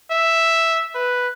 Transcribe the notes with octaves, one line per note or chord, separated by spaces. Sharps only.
E5
B4